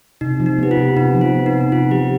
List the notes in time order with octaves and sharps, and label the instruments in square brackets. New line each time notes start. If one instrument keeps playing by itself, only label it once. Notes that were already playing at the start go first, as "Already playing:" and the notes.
[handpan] C3 [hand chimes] D#4
[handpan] F3
[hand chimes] D#4
[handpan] B3 [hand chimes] G4
[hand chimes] F4
[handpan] C3
[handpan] C3 [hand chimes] D#4
[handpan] F3
[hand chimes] F4
[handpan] B3
[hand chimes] D#4
[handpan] C3
[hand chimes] D#4
[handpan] C3 [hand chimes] F4
[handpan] F3 [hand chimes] G4